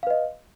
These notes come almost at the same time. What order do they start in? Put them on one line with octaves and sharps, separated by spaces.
F5 B4 D#5